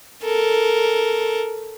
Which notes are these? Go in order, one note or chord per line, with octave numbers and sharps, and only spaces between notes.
A4 A#4